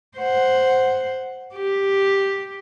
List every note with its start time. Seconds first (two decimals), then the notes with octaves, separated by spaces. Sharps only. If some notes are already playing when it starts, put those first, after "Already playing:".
0.18 C5 F#5
1.55 G4